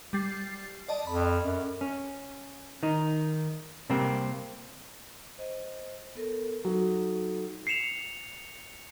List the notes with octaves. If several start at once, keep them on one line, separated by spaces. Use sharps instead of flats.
G3 A6 C7
D5 D#5 A5
F2 B5
F#2
C#4
D#3 D#4
C3 G3 A#3 C4
C5 D#5
B3 A4 A#4
F#3 D#4 A4
C7 C#7 E7 F7